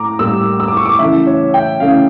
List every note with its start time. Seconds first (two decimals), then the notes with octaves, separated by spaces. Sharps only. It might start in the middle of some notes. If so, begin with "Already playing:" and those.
Already playing: A2 A#5 D6
0.19 A2 G3 A#3 E6
0.60 E6
0.68 D6
0.77 C#6
0.86 D6
0.99 C#3 E3 A3 E5
1.27 C#5
1.54 G5
1.80 C#3 E3 A3 F5